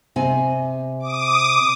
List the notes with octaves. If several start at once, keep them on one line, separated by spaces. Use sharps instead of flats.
C3 D#5 G#5
D6 D#6